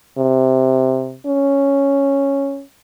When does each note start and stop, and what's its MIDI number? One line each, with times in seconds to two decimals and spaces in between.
0.18 1.17 48
1.27 2.63 61